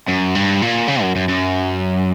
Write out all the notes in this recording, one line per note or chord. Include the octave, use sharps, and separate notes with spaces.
F#2
G2
A#2
C#3
F#2
F#2
F#2